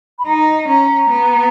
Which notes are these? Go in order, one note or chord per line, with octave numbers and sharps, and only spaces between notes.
B5
D#4 A#5
C#4 A#5
B3